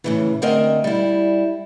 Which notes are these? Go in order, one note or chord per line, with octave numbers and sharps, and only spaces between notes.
A2 C#3 E3
D2 C4 A#4 D#5 E5 F#5
G3 E4